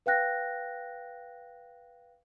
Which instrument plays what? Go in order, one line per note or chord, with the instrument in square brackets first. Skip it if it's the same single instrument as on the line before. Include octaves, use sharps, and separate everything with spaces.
[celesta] B4 F5 G5 F#6 A#6